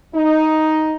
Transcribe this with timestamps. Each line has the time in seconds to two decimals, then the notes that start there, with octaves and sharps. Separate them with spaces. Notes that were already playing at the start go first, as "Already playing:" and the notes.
0.15 D#4